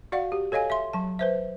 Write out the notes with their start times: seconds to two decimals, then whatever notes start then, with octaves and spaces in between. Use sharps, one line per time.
0.12 F#4 D5 F5 F#5
0.32 G4
0.52 A4 C#5 D#5 F5 G#5
0.70 E5 C6
0.93 F#3 A5
1.19 B4 C5 E5